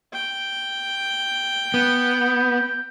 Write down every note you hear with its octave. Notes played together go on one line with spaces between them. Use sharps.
G5
B3 G6